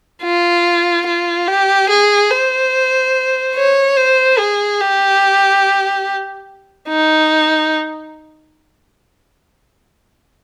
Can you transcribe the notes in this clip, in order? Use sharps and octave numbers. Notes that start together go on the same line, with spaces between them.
F4
F4
G4
G#4
C5
C#5
C5
G#4
G4
D#4